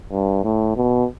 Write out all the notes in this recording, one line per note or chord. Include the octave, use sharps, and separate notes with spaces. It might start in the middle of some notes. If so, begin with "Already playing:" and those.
G2
A2
B2